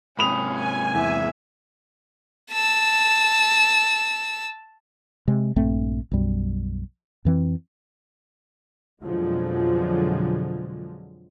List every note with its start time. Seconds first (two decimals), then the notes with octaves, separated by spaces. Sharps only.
0.19 G#2 C3 C#4 B5 D#6 F7
0.53 G#5
0.95 E2 E5
2.52 A5 E6
5.28 C3 G#3
5.56 A#1 G2 A3 C4
6.11 B1 F#2 G3
7.25 F2 E3 C4
9.02 F2 B2 D3 F3 F#3 G#3